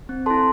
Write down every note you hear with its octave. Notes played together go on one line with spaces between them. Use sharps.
C4
E4 A4 A5 C6